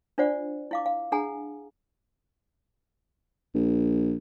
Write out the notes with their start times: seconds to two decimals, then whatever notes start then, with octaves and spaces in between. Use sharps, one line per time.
0.18 D4 F4 C5 D5 F#5
0.71 E4 F5 D6
0.86 F5
1.12 D4 G#4 F#5 G#5 A#5
3.55 A#1